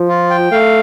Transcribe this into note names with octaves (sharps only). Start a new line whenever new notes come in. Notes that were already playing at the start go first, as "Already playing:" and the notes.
Already playing: F3
F4
G5
A3 F5